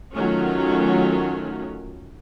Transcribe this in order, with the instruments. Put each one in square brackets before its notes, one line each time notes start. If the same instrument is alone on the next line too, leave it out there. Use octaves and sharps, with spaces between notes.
[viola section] D#3 F#3 A3 C#4 F4